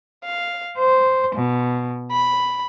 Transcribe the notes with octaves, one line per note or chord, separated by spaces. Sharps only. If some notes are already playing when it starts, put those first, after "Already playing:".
F5
C5
B2
B5